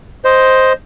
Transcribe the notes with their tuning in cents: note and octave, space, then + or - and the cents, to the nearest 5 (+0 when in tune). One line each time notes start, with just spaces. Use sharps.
C5 +0 D#5 +5